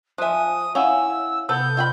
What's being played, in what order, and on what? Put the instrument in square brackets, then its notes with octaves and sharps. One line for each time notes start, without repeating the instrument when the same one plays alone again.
[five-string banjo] F3 E5 [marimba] G#5 F#6 [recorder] D#6
[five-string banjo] C#4 E4 [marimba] F5 F#5 G#5 [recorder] E6
[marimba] C3 [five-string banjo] B3 A4 [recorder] G6
[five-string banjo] F4 G5 B5